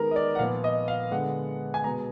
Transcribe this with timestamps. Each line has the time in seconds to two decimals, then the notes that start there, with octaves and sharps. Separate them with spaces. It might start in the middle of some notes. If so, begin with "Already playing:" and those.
Already playing: D#3 G#3 B3 A#4
0.11 D#5
0.16 D5
0.35 F#5
0.39 A#2 F3 B3 F5
0.64 D#5
0.88 F5
1.11 D3 G#3 B3 F#5
1.74 G#5
1.84 B2 G#3 B3 A#5